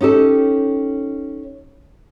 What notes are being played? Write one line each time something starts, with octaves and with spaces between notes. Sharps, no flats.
C#4 D#4 G4 A4